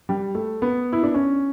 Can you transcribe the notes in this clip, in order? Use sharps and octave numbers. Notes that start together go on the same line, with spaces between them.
G3
A3
B3
E4
D4
C#4